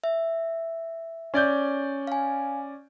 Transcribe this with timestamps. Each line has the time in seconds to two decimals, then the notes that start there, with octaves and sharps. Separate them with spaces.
0.04 E5
1.34 C#4 D5 G6
2.07 F5 G#5